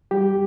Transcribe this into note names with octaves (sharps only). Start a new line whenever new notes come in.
G3 G4